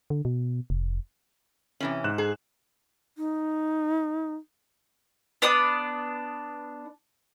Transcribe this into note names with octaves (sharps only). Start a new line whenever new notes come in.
D3
B2
F1
C3 E3 C#4
G#2 F#6 E7
G#4
D#4
B3 D4 D5 D#6